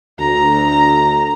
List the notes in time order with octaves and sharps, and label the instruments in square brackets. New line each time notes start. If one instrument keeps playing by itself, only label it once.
[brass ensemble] D2 [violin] A#5